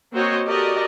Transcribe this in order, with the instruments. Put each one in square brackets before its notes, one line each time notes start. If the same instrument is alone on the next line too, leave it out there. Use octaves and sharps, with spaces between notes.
[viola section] A#3 C4 F#4 C5 C#5 D#5
F#4 G4 A4 A#4 D5 D#5